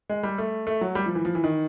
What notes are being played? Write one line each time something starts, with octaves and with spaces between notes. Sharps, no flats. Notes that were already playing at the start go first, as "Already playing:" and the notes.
G#3
G3
A3
A3
F#3
G3
F3
E3
F3
E3
D#3